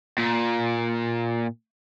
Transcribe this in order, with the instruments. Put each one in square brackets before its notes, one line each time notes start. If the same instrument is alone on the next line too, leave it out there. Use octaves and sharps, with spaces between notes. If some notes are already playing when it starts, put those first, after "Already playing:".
[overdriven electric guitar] A#2